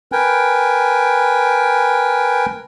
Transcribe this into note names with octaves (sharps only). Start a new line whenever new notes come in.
A#4 B4 G5 G#5